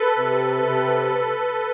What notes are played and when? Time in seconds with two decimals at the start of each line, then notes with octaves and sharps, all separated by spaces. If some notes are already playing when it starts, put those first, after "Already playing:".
Already playing: A4 B4
0.16 C3
0.63 C3